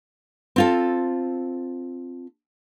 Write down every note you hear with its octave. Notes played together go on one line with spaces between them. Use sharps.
C4 F4 A4